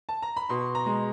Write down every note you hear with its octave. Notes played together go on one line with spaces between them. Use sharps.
A5
A#5
B5
B2 C6
A#5
G#3